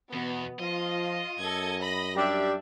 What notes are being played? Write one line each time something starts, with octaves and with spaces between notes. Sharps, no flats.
E2 B2 B3
F3 F4 D#5
F#2 A4 G#6
B5 A#6
G3 D4 G4 E5